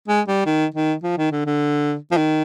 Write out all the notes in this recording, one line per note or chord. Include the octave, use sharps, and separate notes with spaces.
G#3
G3
D#3
D#3
F3
D#3
D3
D3
F3
D#3